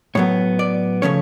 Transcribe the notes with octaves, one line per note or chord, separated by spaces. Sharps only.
A2 F#3 B3 C#5
D5
C#3 F3 A3 C#4 C#5